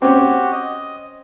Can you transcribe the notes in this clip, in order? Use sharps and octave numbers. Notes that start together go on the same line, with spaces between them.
C4 C#4 F#4 G4
D#5